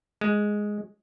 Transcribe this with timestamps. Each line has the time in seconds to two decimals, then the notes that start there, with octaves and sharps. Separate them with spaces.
0.21 G#3